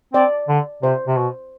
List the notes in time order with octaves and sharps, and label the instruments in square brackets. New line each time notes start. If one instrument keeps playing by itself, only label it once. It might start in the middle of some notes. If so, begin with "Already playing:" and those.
[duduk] C4 [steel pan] D5
[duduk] D3
[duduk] C3 [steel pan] C5
[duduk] C3
B2